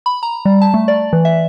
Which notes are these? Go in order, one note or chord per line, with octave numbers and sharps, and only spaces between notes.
B5
A#5
G3
A5
A3
D5
E3
E5